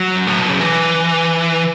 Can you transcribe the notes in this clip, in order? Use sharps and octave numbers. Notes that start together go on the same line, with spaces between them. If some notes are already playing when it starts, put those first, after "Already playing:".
Already playing: F#3
F#2
A2
B2
C#3
E3